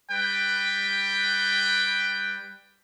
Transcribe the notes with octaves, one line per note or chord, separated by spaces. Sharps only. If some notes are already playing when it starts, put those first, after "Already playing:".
G3 B4 G5